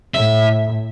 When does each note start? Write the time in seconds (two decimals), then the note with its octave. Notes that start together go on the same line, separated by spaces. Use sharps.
0.14 A2 E5